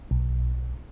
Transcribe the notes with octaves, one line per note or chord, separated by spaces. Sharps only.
B1